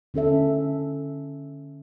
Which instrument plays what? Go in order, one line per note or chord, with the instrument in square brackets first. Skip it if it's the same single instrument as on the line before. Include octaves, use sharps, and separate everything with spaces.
[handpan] D3 C#4 A4 E5